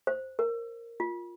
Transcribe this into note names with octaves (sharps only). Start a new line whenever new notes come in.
C5
A#4
F4